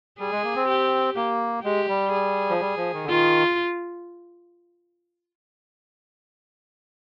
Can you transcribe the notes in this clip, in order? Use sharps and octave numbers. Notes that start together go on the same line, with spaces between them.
G3 G#4
G#3
A#3
C4
G4
A#3
G#3 G4
G3
G#4
F3
G3
F3
D#3
D3
D#3 F4